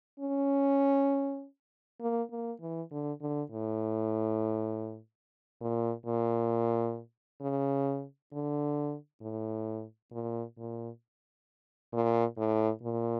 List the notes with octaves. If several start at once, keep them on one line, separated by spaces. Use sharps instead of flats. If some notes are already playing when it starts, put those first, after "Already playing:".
C#4
A#3
A#3
E3
D3
D3
A2
A#2
A#2
C#3
D3
A2
A#2
A#2
A#2
A2
A#2